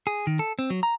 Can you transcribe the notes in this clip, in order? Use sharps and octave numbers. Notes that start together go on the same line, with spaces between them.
G#4
D#3
A4
C4
F#3
A#5